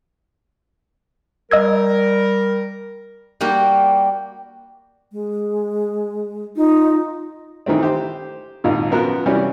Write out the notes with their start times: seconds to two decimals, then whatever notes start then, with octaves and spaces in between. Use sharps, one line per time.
1.51 G3 A#4 D#5 E6 G#6
3.41 G3 A#3 F#4 G4
5.12 G#3
6.56 D#4 F4
7.66 D#3 E3 A3 C4
7.83 G4 C5
8.64 G#1 A#2 D#3
8.91 F#2 F3 B3 F#4 A#4
9.26 C3 E3 G3 C#4 F#4